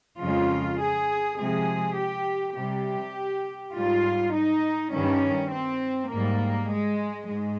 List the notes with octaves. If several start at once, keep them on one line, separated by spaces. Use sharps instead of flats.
F2 C#3 F3 G#3 F4
G#4
C3 F3 G#3 G#4
G4
C3 G3 G4
G#2 G3 F4
D#4
G2 D#3 G3 C#4
C4
G#2 G3 A#3
G#3
G#2 G#3